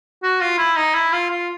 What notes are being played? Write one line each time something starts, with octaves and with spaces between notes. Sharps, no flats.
F#4
F4
E4
D#4
E4
F4
F4